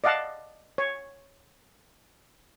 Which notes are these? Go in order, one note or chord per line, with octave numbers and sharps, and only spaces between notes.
D5 D#5 F5 F#5 A5
C#5